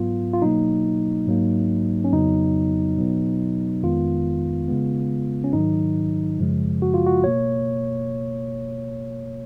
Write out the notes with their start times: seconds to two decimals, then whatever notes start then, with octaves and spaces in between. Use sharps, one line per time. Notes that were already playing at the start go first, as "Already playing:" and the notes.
Already playing: G#2 F#3 B3 F4
0.34 F4
0.42 B2 F#3 A#3 D#4
1.27 G#2 F#3 A#3
2.04 C#4
2.12 F2 C#3 F#3 B3 D#4
2.98 B2 F#3 B3
3.83 F2 D#3 G#3 B3 F4
4.68 C#3 G#3 B3
5.44 C#4
5.53 G#2 D#3 F#3 D#4
6.39 F#2 C#3 F3 G#3
6.82 F#4
6.94 F4
7.06 F#4
7.24 B2 A#3 C#5